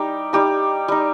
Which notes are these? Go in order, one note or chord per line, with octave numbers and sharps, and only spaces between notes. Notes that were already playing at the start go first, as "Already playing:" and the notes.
Already playing: G3 D#4 G4
G3 D#4 G4
G3 D#4